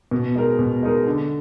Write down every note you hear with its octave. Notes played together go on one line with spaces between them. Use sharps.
B2
G#3 D#4 A#4
B2
G#3 D#4 A#4
D3